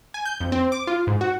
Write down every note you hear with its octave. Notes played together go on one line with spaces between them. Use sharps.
G#5
G6
F2
C4
D6
F4
G#2
F#4